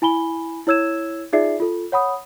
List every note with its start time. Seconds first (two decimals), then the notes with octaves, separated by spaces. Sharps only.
0.02 E4 G#5 B5 G7
0.67 E4 C#5 E6 G#6 E7
1.33 D#4 F4 G#4 D5 E5 C7
1.60 F4 A4
1.92 C#5 F#5 B5 D#6